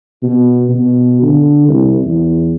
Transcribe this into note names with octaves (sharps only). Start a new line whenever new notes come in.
B2
B2
D3
C2
E2